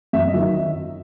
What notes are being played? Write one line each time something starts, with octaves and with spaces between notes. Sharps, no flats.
F#2 E5
D#5
D#3 F#3
E5